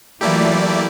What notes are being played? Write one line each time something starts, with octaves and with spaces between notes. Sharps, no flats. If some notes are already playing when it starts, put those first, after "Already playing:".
E3 F#3 A3 A#3 E4 F4 G4 D5